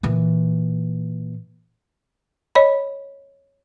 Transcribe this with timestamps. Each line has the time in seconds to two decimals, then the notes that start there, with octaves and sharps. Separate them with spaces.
0.03 A#2 E3
2.55 C#5 D#5 B5